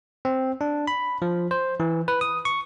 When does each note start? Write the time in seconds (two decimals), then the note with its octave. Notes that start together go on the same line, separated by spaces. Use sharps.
0.25 C4
0.61 D4
0.87 B5
1.22 F3
1.51 C5
1.80 E3
2.08 B4
2.21 D#6
2.45 C#6